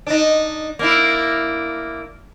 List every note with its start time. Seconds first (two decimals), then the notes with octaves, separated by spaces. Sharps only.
0.07 D4 D#4
0.79 A#3 D4 E4